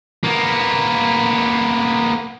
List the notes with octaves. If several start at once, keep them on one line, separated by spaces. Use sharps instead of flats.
A#3 B3